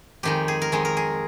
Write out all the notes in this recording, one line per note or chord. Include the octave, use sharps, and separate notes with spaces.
F2 D#3 G#3 G4
G#4
A#4
F2 D#3 G#3 G#4
A#4
G#4